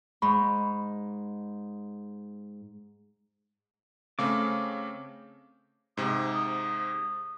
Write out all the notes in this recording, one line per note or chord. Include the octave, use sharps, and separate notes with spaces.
G#2 B5 C#6
C#3 A3 C4 G#4 C#5 F5 D6
G#2 C3 D#6